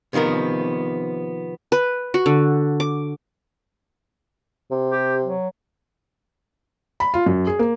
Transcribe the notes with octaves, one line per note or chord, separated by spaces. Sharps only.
C3 D#3 F3 B3 A#4
B4
F#4
D3
D6
C3
G4
F#3
B5
F4
F#2
G#4
A#3